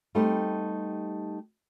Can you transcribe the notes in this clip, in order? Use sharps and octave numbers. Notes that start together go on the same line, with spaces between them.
G3 A3 B3 C4 D#4 G4